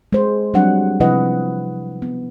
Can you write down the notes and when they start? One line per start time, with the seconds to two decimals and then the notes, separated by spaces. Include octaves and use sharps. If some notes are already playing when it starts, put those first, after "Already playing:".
0.12 G#3 C5
0.54 F#3 G3 C4 D4 F#5
1.00 C3 F3 E4 B4 D#5 F#5
2.02 B3